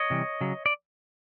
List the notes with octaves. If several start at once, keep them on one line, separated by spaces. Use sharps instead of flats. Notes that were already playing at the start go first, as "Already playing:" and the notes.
Already playing: C#5 D#5
C3 E3 G3
C#3 F#3
D5